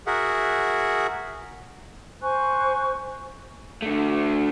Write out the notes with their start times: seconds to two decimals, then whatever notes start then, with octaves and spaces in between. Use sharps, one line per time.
0.07 F#4 G#4 A#4 E5 F#5
2.21 C5 G#5 C#6 F#6
3.82 D3 A3